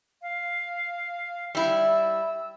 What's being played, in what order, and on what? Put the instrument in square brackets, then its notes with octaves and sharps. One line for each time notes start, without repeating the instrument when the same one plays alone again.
[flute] F5
[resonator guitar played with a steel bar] G3 E4 [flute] E6